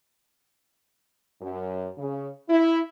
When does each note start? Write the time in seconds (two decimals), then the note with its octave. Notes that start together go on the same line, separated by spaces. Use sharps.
1.42 F#2
1.98 C#3
2.49 E4